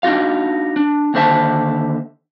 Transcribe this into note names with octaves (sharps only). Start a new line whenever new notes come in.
D4 D#4 F4 F#4 F5
D4
D#2 D3 C5 E5 A5